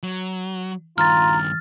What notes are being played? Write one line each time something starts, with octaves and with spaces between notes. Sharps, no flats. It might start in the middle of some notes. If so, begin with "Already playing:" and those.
F#3
G2 D#3 F4 A#5 F6 A6